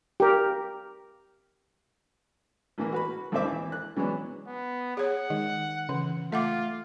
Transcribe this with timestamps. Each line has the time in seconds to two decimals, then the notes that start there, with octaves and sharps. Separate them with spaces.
0.20 G4 A#4
2.78 A1 E3 A#3
2.92 F#4 B4 B5
3.32 A#1 D#2 C4 C5 E5 D6
3.45 E3
3.72 F#6
3.97 E3 F#3 G#3 B3 C#4 D4
4.47 B3
4.97 G#4 C#5 F#5
5.30 D#3 G#3
5.89 C#3 E3
6.32 A3 F4 E5 F#5 D6